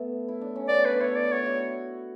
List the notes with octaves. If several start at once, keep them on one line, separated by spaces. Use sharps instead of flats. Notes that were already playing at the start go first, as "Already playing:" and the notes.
Already playing: A3 B3
E4
D4
C#4
B3 D5
E4
D4 B4
D4 E4 C#5
D5
E4
F#4 C#5
F#4